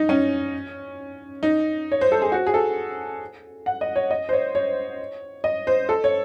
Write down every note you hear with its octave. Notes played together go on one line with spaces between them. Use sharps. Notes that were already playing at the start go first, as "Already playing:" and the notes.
Already playing: D#4
C#4
D#4
C#5
C5
A4
G#4
F#4
G#4
A4
F#5
D#5
C#5
D#5
C5
C#5
C#5
D#5
C5
A4
C#5